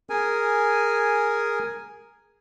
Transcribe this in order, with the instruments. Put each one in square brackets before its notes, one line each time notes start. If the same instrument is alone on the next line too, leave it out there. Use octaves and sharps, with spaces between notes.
[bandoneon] G#4 A#4 G#5